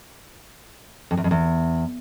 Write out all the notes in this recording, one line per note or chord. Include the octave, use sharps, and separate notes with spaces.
F2
E2
F2
E2